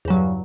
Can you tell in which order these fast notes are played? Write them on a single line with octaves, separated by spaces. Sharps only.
E2 C#3 F#3 G2